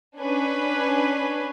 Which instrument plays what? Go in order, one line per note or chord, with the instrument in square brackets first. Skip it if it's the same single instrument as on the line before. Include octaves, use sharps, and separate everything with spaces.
[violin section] C#4 D4 B4 G#5